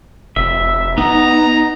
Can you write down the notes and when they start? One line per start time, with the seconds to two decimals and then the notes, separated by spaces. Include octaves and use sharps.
0.36 F1 E5
0.98 B3 D#4 A#5